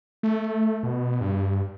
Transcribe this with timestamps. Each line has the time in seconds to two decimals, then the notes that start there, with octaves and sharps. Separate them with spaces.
0.23 A3
0.83 B2
1.21 G2